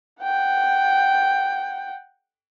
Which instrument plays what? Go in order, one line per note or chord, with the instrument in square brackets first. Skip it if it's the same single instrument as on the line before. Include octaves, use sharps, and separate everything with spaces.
[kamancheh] F#5 G5